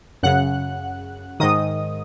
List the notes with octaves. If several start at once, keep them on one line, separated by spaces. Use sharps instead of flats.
F#2 C#3 F#5 F#6
G#2 D#3 D#5 D#6